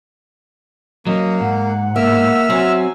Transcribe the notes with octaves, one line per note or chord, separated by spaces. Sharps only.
F#3 A#3 C#4 D#5
G#2 F#5
A#3 E5 E6 F6
F#3 C4 G#5